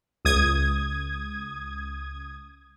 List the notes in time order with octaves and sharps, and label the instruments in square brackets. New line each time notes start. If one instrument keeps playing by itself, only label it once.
[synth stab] C#2 D#6 G#6